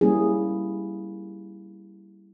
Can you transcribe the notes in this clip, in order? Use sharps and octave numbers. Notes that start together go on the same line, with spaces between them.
G3 A#3 C#4 E4 G#4